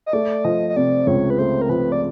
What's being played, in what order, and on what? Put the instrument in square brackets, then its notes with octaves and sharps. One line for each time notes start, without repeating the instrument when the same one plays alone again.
[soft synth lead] D#5
[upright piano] A3 [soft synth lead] D5
[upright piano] F3 [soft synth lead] D#5
[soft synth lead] D#5
[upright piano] C3 [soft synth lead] D5
[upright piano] C#2 [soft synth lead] C#5
[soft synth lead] B4
[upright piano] A3 [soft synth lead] C5
[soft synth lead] A#4
[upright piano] F3 [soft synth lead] B4
[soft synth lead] D5